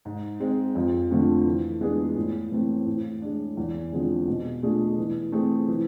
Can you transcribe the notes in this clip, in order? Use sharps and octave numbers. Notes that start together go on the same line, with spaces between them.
G#2
G#3 C4
F2
D3 F3 A3 C4
E3
G#3 B3 D4 G#4
A2
E3 A3 C4
A2
G#3 D4
E2
D3 F3 G#3 C4
B2
A3 D4 F4 G#4
E3
A3 C4 G#4
E3